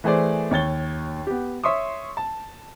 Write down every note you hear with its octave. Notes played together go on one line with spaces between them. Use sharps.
E3 A3 G#4 C5 D5
D#2 C#5 A6 G7
B3 G4
C#5 E5 C6 C#6 D#6
A5